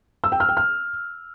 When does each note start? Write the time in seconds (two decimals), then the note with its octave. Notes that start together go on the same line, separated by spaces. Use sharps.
0.24 E6
0.32 G5
0.40 F6
0.49 G5
0.57 F6